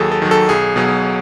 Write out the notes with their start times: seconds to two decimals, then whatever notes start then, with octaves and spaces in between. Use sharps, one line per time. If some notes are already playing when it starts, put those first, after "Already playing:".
Already playing: D#2 D#3 F#3 D#4 G#4 A4
0.12 A4
0.22 D#3 F#3
0.31 A4
0.49 B1 G#4
0.76 B2 F#3 G#4